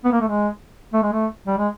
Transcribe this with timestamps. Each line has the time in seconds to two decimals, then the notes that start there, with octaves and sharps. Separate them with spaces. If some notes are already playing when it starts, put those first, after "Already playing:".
0.05 B3
0.12 A#3
0.21 A3
0.28 G#3
0.93 A3
1.03 G#3
1.12 A3
1.47 G3
1.58 G#3